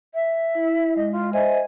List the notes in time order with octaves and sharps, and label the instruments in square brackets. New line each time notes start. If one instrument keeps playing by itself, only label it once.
[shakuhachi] E5
[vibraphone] E4
[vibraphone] G#3 [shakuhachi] D#5
[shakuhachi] F4
[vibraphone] C5 D#5 E5 [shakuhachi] G#5